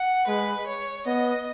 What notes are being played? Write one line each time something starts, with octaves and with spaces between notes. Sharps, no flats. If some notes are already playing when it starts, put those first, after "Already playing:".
Already playing: F#5
G#3 B4
C#5
B3 D#5